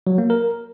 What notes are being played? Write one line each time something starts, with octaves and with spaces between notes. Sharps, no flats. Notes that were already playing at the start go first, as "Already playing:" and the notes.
F#3
A#3
A#4